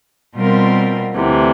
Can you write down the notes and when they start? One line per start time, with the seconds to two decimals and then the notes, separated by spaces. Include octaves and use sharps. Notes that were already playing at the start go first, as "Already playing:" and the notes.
0.35 B2 G3 C4 F4 A#4
1.14 D2 C3 E3